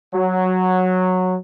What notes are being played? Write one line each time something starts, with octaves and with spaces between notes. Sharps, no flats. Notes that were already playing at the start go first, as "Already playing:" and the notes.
F#3